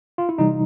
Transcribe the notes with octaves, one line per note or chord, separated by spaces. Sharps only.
F4
E4
C3 E3 G3 D#4